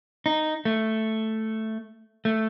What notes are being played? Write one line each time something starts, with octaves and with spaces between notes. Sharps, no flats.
D#4
A3
A3